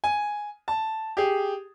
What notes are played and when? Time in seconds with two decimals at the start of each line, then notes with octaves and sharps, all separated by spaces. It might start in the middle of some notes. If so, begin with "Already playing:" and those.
0.04 G#5
0.68 A5
1.17 G4 G#4